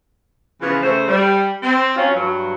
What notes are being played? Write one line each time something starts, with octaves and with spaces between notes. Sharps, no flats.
C#3 E3 F3 B3 F4 B4
C#3 A3 C5
G3
C4
F#3 C#4 F4
G2 F#3